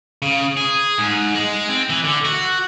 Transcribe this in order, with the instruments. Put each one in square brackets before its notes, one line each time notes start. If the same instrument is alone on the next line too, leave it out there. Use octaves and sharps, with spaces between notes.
[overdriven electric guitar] C#3
G#4
G#2
G#3
C4
E3
D3
F#4